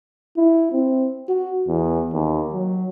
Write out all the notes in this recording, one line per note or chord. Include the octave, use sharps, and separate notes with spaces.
E4
C4
F#4
E2
D#2
F#3